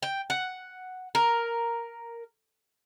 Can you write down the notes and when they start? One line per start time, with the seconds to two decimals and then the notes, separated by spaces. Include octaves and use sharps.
0.02 G5
0.30 F#5
1.15 A#4